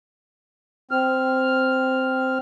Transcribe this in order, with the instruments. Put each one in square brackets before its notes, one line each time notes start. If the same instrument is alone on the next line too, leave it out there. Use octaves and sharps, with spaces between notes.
[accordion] C4 F6